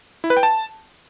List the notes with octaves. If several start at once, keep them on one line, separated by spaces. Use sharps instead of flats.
E4
B4
G5
A5